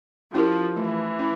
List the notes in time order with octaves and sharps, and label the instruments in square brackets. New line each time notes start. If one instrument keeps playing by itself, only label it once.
[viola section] F3 [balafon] C#4 E4 G4 A#4
[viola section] E3 [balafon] A3
[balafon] C#4 E4